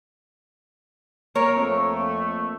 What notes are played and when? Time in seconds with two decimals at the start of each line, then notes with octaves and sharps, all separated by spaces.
1.36 A#3 A#4 C#5
1.56 F2 A3